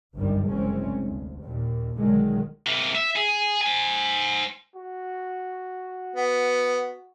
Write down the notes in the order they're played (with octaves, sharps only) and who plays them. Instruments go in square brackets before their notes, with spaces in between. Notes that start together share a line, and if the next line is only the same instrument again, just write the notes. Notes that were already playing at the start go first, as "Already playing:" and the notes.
[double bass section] G1 C2 F#2 D#3 G3
F#1 C2 E3 G#3 C4 C#4
D2
D#2 A#2
B1 D3 D#3 F#3 G#3
[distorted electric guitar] C3 A#3
E5
G#4
C5 G#5
[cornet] F#4
[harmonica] B3